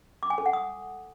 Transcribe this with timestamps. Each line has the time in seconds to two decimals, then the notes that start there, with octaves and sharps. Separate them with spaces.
0.23 D6
0.30 G#5
0.38 A4
0.46 F#5
0.53 D#6